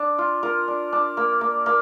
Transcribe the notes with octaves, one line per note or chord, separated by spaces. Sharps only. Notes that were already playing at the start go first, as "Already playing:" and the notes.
Already playing: D4
F4
F4 A#4
D4
D4
A#3
A#3
A#3